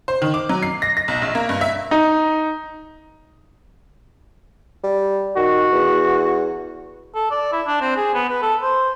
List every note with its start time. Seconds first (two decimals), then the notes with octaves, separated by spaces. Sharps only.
0.08 C5
0.22 D#3
0.34 D6
0.49 F#3
0.63 C7
0.82 A#6
0.97 A#6
1.08 B1
1.22 A#1
1.35 A#3
1.49 G2
1.61 E5
1.91 D#4
4.84 G3
5.37 D#3 F#4
5.72 E2
7.15 A4
7.31 D5
7.52 E4
7.67 D4
7.81 C4
7.96 G#4
8.14 B3
8.29 B4
8.43 A4
8.62 C5